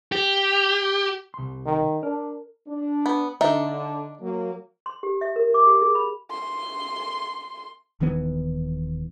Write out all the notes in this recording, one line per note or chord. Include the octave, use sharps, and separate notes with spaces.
G4
C2 C6
D#3
D4 A#4
D4
B3
D3 D4 D#4 E5
F#3 A#3
C6
G4
E5
A#4
D6
G4
G#4
B5
C6
D#1 D#3 E3 B3